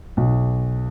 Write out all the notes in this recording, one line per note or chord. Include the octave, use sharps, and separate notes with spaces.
B1